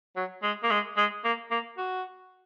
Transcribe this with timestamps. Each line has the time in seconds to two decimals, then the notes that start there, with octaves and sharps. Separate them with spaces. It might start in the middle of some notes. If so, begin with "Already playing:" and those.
0.17 F#3
0.43 G#3
0.63 A#3
0.71 G#3
0.97 G#3
1.24 A#3
1.51 A#3
1.78 F#4